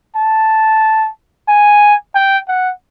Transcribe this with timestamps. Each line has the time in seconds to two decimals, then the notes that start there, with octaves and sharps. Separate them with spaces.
0.16 A5
1.48 G#5
2.15 G5
2.48 F#5